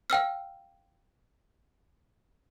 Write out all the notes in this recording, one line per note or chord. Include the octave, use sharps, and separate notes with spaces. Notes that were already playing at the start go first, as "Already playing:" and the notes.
F5 G5 E6 F6